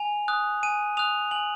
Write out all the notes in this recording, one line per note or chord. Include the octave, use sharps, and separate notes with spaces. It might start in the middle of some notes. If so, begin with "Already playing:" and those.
Already playing: G#5 F7
D#6 F#6
G#5 D#7
D#6 F#6 F7
G#5 F#7